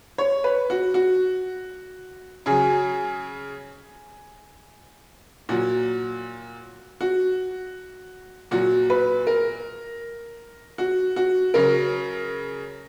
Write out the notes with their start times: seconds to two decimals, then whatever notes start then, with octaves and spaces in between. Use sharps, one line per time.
0.18 C#5
0.44 B4
0.70 F#4
0.94 F#4
2.46 C#3 F#3 G#4
5.49 A#2 F#3 F#4
7.01 F#4
8.51 A#2 F#3 F#4
8.90 B4
9.27 A#4
10.78 F#4
11.16 F#4
11.54 C#3 F#3 A#4